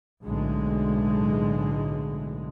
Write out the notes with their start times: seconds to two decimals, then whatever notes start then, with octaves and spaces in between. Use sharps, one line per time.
0.23 B1 A2 D3 G#3